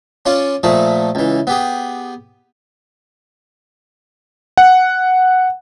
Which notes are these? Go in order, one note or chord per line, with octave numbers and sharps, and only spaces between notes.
C#4 F4 C#5 D5 G#5
A#2 F3 A3 G#4
C#2 E3
B3 G4 G#4
F#5